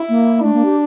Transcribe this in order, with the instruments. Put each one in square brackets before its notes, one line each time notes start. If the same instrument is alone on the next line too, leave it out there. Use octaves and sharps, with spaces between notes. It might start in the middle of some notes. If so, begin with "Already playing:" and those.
Already playing: [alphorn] E4
[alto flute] A#3
[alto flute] A3 [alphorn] D4
[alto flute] A#3
G4